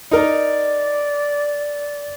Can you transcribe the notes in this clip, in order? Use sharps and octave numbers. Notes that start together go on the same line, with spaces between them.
D#4 A#4 D5